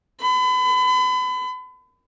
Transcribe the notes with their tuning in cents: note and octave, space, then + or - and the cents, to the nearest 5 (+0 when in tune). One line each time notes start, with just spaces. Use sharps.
B5 +35